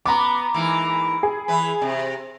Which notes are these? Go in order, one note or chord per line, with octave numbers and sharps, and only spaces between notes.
B3 A#5 D6
G#2 E3 A#3
G#4
E3 E4 B4
C3